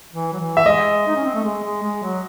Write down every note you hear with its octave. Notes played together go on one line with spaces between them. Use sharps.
E3
F#3
E3
E5
G#3 D#5
D#4
C#4
C4
A3
G#3
G#3
G#3
F#3